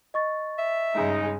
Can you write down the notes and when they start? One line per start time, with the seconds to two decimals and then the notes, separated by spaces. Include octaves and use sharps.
0.14 D#5 C#6 A6
0.58 E5
0.95 G2 C#3 G#3 D#4